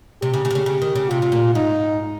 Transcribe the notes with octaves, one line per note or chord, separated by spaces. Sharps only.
C3 G4
C#3
C#3
C3
C#3
C#3
D#3
C#3
C3 F4
C3
A#2
G#2 D#4